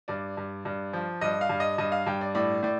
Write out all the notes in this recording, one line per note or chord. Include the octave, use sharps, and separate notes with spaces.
G2 D5
G2
G2
F3
G2 D#5
F5
G2
D#5
G2 D#5
F5
G2 G5
D5
A2 D5
A2 D5